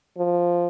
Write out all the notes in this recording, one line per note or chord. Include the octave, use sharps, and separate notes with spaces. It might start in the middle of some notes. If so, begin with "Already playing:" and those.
F3